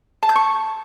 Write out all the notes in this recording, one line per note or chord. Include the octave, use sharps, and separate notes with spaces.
A5
G6
C#6